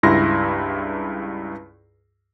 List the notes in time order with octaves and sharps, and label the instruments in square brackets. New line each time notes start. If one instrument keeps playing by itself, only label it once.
[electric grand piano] C#2 G2 E4 C6 A#6